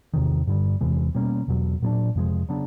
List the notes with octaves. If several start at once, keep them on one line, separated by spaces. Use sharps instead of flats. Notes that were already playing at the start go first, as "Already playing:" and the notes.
E2 C3 D#3
G2 D3 G3
E2 C3 E3 G#3
B2 G3 A#3 C#4
E2 B2 F#3
A#2 F#3 B3 D4
F2 C3 F3 G#3
C#3 F#3 B3 D4